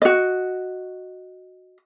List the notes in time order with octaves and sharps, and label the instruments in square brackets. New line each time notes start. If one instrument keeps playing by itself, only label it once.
[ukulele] F#4 D#5